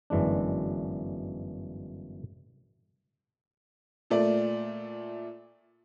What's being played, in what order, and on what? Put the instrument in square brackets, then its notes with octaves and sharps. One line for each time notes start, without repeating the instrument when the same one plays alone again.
[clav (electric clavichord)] G1 F#2 E3 G#3 D4
[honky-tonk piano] A#2 A3 D5